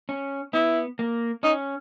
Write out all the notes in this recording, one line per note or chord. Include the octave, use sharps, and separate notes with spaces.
C#4
B3 E4
A#3
C#4 D#4